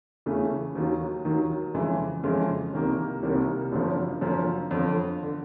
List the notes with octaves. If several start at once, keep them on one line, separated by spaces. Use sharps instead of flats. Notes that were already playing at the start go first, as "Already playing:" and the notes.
E2 C#3 E3 A3
D#2 D#3 F#3
D#2 D#3 F#3
F2 C#3 E3 G#3
F2 C#3 E3 G#3
C2 C3 D#3 G3 A#3
C2 C3 D#3 G3 A#3
F#1 F#2 D3 F3
F#1 F#2 D3 F3
G1 F2 D3
D3